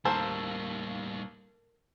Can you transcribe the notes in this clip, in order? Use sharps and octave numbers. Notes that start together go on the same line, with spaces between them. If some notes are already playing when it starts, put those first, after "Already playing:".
D#2 A2 G3 A#3 A4 A#4 C5 E6